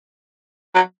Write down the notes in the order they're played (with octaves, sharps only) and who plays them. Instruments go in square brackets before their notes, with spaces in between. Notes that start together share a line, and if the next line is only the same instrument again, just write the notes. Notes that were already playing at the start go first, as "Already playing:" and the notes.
[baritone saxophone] F#3